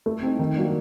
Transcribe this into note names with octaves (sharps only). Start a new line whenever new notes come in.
A3
C4 D#4
D#3
F#3 A#3 D4